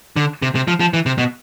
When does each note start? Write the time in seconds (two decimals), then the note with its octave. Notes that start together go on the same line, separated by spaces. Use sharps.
0.16 D3
0.42 C3
0.55 C3
0.68 F3
0.80 F3
0.94 E3
1.06 C3
1.18 B2